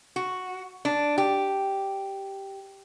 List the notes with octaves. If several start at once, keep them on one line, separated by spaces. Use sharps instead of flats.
F#4
D4
G4